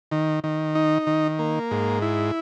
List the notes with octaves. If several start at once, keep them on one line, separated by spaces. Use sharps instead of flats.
D#3
D#3
D#4
D#3
A#3
G#2
E4